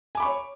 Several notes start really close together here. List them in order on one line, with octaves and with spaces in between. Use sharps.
G#5 D6 B5 C#6 C#5